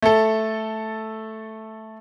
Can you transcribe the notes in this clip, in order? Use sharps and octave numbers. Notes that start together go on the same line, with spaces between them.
A3 A4